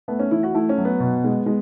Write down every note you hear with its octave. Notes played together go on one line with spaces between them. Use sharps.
A3 B3
C#4
E3 E4
F#4
A3 E4
C#4
F#3
B3
B2
G#3
G#3